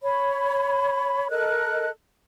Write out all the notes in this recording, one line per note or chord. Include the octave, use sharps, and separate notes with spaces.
C#5 B5
A4 A#4 D#5 F#6